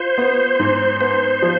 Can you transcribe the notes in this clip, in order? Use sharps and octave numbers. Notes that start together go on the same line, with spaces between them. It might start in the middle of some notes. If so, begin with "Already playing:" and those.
Already playing: F4 C5
B3
G#2
B3 C5
F3